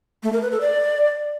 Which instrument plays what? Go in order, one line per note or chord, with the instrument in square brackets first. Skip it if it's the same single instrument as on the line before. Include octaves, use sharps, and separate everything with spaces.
[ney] A3
A#4
B4
A4
D5